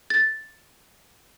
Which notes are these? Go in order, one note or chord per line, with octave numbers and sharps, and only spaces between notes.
A6